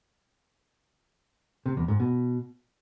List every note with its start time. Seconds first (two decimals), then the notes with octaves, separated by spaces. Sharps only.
1.66 C3
1.77 E2
1.88 G#2
2.00 B2